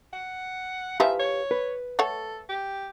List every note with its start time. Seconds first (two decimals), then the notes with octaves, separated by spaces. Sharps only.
0.13 F#5
1.00 E3 F3 D#4 G4 B4 E5 F5
1.19 C#5
1.51 B4
1.99 A3 A4 C#5 F#5
2.49 G4